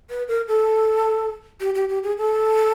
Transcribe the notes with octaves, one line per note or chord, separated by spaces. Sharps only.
B4
A#4
A4
G4
G4
G4
G#4
A4